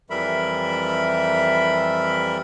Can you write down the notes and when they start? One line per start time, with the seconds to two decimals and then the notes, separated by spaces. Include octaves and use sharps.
0.10 F2 E3 G3 A#4 E5 B5